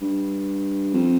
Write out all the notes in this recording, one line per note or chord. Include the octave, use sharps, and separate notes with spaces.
G2
F2